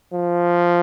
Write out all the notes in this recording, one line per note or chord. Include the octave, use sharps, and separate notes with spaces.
F3